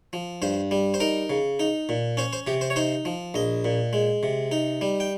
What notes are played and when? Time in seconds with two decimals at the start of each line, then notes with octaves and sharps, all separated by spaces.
0.13 F3
0.42 G2 C5
0.71 G3
0.94 C5
1.00 D#4 A#4
1.30 C#3
1.59 D#4
1.89 A#2
2.17 C#4 C5
2.33 C5
2.47 C3 G4
2.61 C5
2.70 C#5
2.76 D#4 C5
3.05 F3
3.34 A#1 D#5
3.65 A#2
3.93 G#3
4.23 C3
4.52 D#4
4.81 G3
5.00 G5